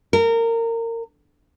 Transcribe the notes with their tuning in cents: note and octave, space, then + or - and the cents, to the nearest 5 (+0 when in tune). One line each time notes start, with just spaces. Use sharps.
A#4 -25